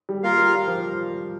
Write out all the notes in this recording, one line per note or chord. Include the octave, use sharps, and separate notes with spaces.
G3
A#3 F4 A#4 F5
G3
G3
F3